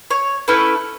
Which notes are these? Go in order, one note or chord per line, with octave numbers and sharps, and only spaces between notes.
C#5
A3 C#4 E4 A4 B4